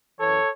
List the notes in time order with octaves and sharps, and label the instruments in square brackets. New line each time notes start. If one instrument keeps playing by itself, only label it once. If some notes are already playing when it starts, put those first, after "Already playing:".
[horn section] F#2 E3 A4 C#5